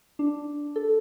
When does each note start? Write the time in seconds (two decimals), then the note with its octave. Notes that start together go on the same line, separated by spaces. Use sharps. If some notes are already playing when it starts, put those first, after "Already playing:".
0.19 D4
0.76 A4